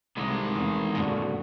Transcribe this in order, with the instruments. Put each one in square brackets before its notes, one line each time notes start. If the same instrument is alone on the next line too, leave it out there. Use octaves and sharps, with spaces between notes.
[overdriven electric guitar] C2 [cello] D3 [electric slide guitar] D#3 G#3
[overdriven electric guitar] E2 [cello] A3 C4
[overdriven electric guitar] F#2 A#2 [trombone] D3 [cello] F#4